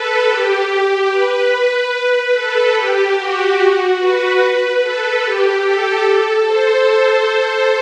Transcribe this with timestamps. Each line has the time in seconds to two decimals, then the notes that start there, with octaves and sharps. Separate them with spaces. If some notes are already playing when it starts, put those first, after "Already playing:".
Already playing: A4 B4
0.28 G4
1.10 B4
1.93 B4
2.34 A4
2.76 G4
3.17 F#4
3.99 B4
4.81 A4
5.23 G4
5.64 A4
6.46 C5